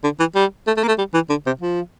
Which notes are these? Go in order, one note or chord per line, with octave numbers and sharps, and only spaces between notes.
D3
E3
G3
A3
A3
A#3
A3
G3
E3
D3
C3
F3